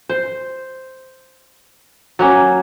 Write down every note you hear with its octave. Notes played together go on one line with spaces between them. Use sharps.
C5
F#3 A#3 C#4